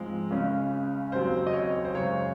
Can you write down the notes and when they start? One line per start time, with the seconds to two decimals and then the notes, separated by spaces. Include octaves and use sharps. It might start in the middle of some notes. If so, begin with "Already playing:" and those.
Already playing: G#2 F3 G#3 C4
0.31 C#2 C#3 G#3 C#4
1.12 D#2 C#3 F#3 C4 C5
1.47 D#5
1.53 C#5
1.85 C5
1.94 F#2 C#3 G#3 C#5